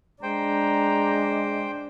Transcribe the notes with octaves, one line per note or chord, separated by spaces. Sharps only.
G#3 D4 C5 G5 A#5